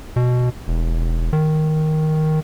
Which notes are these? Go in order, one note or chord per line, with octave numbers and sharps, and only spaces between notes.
B2
E1
D#3